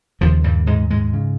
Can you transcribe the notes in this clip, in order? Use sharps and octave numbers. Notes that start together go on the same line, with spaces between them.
D#2 C#3 F3
G2 G3
G#2 G#3
G#2 G#3
C#3